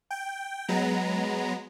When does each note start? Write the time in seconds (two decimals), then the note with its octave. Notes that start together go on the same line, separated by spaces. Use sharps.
0.11 G5
0.68 F#3 G#3 B3 A#5